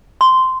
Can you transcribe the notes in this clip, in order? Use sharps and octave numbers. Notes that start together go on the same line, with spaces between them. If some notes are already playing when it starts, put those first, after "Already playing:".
C6